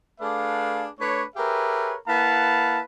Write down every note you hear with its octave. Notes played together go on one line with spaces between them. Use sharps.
A3 D4 G#4 B4 D5 F5
A3 D4 B4 C#5
G4 G#4 A#4 B4 C#5 E5
A#3 E4 B4 F5 F#5 A5